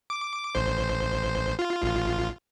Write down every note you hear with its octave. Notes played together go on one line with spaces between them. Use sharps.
D6
A1 C5
F4
A1 F4